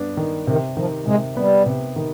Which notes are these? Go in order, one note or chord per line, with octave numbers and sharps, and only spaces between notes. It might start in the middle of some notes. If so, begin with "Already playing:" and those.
Already playing: G2 B3 D4
D#3
C3 D#3
D#3 F3
C3 G#3
G3 B3
C3
D#3